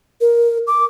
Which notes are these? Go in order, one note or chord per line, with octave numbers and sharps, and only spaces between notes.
A#4
D6